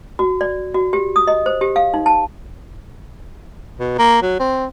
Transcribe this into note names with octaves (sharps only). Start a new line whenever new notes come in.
F#4
D5
F#4
G4
D#6
D#5
C5
G4
F5
D#4
A5
B2
A#3
F#3
C4